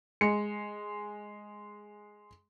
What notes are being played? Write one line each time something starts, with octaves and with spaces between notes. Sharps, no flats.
G#3 C#7